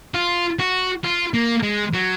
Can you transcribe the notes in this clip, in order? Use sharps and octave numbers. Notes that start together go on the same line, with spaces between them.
F4
F#4
F4
A#3
G#3
F#3